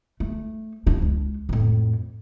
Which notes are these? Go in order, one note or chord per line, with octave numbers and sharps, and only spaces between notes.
A3
F3 D4
C#2
F2 A2